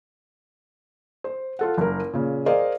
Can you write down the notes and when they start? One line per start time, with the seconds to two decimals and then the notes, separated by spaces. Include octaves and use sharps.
1.24 C5
1.59 F4 A4 F#5
1.77 F#1 A#4
2.13 A#2 C#3
2.46 G#4 A#4 C5 D5 D#5 F5